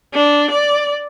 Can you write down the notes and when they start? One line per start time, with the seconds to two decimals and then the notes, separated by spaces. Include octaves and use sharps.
0.14 D4
0.51 D5